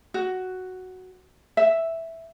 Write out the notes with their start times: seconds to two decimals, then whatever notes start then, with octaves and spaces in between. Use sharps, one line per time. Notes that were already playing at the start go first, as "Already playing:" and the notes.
0.14 F#4
1.57 E5